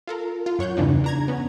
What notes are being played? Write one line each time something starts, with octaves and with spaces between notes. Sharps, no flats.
F4 A4 A#4
F4
F#2 C#5 F#5 G6
E2 G2 C#3 E3 D4 D#4
D4 A#5 G#6
B3 C#4